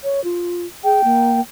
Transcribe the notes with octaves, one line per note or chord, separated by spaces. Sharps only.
C#5
F4
G#4 G5
A#3